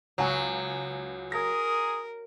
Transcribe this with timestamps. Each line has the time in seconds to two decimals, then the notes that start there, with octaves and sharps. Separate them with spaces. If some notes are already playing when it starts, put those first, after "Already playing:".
0.18 C#2 F#3 G#5
1.32 G#4 A#4 A#5 D#6 A#6